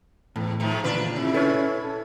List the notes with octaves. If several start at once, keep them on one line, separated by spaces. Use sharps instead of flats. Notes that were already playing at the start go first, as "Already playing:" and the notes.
E2 A2
G#2 D#3 F3 A3
A#2 D3 E3 D4 F4 B4
C3 E4
C#4 A4 B4 C#5
A4